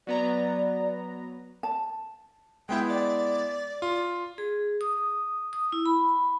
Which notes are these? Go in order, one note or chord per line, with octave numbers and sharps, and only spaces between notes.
F#3 B3 D5 A#5
A5
G#3 B3 E4 G5
D5
F4
G#4
D#6
D#6
E4
B5